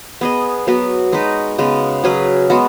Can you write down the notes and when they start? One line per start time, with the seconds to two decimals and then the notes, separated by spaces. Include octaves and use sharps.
0.21 B3 G#4 D#5
0.67 F#3 B3 F#4 B4
1.12 G#3 D#4 F#4 B4
1.58 C#3 G#3 B3
2.04 F#3 C#4 G#4 B4
2.50 G#3 B3 F#4